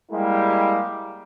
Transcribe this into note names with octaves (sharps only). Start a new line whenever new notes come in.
G3 G#3 A#3 E4 G4